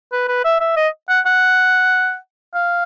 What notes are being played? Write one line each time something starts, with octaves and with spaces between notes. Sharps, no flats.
B4
B4
E5
E5
D#5
F#5
F#5
F5